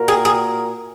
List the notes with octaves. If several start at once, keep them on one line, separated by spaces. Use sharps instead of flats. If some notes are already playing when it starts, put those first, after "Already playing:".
Already playing: A#2 A#3 F#4 A#4
G#4
G#4